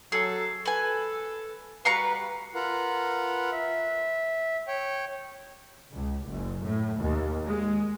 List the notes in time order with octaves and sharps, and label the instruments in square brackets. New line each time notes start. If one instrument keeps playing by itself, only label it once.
[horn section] F#3 A4 [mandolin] G#4
[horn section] A4 [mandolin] B4 G#5
[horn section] G3 F#4 B4 [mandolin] F5 A#5 C#6
[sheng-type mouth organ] F4 A#4 B4 F#5
E5
C#5 G5
[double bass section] C#2
F#1
A2
D#2
G#3